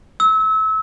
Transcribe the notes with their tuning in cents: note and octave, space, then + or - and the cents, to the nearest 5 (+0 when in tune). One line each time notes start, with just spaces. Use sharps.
E6 -30